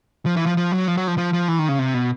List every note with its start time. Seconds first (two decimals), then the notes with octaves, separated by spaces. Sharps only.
0.26 F3
0.36 E3
0.46 F3
0.57 F3
0.72 F#3
0.88 F3
0.97 F#3
1.07 F3
1.18 F3
1.33 F3
1.48 E3
1.59 D#3
1.68 C#3
1.79 C3
1.94 B2